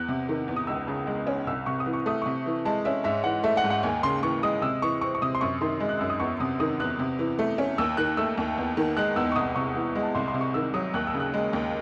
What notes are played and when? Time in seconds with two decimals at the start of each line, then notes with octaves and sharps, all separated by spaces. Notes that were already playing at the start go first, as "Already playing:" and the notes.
Already playing: E2 F#6
0.08 C3
0.29 D#3
0.48 E2
0.57 D#6
0.67 C#2 E6
0.87 C#3
1.07 G#3
1.27 C#4
1.47 C2 E6
1.66 C3 C#6
1.80 D#6
1.86 E3
1.93 C#6
2.06 A3 D#6
2.22 C3 C#6
2.46 E3
2.65 G#3 A5
2.85 C#4 E5
3.04 G#2 E5
3.24 E3 F#5
3.43 A3 E5
3.57 F#5
3.64 G#2
3.70 F#5
3.83 D#2 G#5
4.03 C#3 C6
4.23 E3 C#6
4.43 G#3 D#6
4.62 C3 E6
4.82 E3 C#6
5.01 C4 C#6
5.15 C#6
5.22 C3 D#6
5.35 C6
5.41 F#2 C#6
5.61 D#3 C6
5.80 G#3
5.89 F#6
5.99 F#2 E6
6.10 D#6
6.20 E2 C#6
6.40 C3 D#6
6.60 D#3 D#6
6.80 E2 F#6
6.99 C3
7.19 E3
7.39 A3
7.58 C#4
7.78 D#2 E6
7.97 D#3 F#6
8.17 A3 E6
8.37 D#2
8.57 E2
8.77 D#3
8.97 G#3 F#6
9.16 E2 E6
9.32 C#6
9.36 C2 D#6
9.56 C3 C#6
9.75 E3
9.95 G#3
10.03 A5
10.15 C2 C6
10.28 C6
10.34 C3
10.41 C#6
10.54 D#3 E6
10.74 F#3 D#6
10.94 D#2 F#6
11.07 E6
11.14 C#3
11.20 F#6
11.34 G#3
11.53 D#2